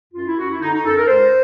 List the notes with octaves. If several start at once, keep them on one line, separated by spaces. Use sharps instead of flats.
F#2 F4
E4
F#2 F#4
E4
D3 D#4
D#4
F#2 A4
A#4
C#2 C5